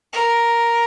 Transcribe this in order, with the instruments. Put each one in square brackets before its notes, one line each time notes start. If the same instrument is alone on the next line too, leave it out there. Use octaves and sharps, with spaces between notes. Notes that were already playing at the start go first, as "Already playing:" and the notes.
[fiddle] A#4